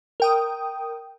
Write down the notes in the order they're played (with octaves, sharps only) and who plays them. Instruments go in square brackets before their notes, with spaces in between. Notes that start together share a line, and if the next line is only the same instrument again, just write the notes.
[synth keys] A#4 G5 D#6